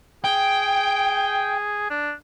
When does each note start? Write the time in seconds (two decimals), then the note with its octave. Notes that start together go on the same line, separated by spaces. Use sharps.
0.25 G#4 G5
1.90 D4